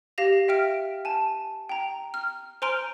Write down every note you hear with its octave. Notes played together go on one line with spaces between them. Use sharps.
G4 F5 A#6 F7
E5 G5 F6 D7
G#5 A5
G5 A#5
F6
C5 G#5 A#5 C6 F6 D7